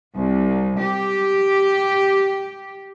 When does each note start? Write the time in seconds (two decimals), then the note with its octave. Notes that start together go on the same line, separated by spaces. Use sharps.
0.17 C2
0.80 G4